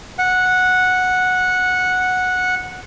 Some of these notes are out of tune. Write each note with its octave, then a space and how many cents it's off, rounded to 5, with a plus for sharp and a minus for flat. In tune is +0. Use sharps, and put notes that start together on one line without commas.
F#5 -10